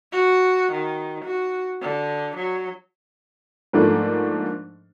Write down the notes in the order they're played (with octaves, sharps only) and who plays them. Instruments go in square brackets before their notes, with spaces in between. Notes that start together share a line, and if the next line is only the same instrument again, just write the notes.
[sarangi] F#4
D#3
F#4
D3
F#3
[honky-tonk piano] G#2 F3 A3 A#3 D4